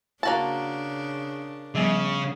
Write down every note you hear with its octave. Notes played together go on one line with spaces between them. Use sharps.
C#3 A#3 D4 F#4 A5
C#3 F3 G3 B3